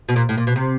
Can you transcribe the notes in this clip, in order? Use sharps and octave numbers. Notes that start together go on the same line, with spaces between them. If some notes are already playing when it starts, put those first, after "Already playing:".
B2
A#2
A2
A#2
B2
C3